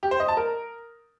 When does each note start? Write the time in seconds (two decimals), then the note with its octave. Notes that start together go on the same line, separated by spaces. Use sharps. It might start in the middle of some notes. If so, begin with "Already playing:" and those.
0.03 G4
0.11 C5
0.20 D#5
0.28 A5
0.37 A#4